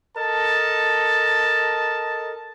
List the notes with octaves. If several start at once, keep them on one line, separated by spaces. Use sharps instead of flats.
A4 A#4 D#5 A5